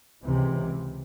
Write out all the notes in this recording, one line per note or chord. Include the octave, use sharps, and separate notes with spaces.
C#2 C3 E3